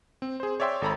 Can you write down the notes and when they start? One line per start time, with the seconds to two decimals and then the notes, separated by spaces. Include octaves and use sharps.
0.22 C4
0.40 G#4 C5
0.60 C#5 D5 E5 G5 C6
0.82 G#1 A4 A#5 B5